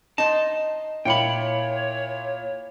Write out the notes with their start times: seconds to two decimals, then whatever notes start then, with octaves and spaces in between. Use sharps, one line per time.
0.18 D#4 C5 A5
1.05 A#2 E4 C#5 G5 B5 C#7